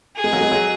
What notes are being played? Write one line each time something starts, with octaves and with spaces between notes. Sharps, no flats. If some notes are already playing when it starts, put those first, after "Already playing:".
G#4
G#3
F#3
G#3
F#3